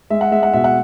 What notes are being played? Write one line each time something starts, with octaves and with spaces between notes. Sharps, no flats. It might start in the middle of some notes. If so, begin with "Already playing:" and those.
G#3 E5
F#5
G#3 E5
F#5
B2 E5
F#5